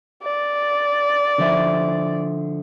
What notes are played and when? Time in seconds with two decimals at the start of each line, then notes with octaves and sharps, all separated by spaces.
0.23 D5
1.38 D3 F3 E5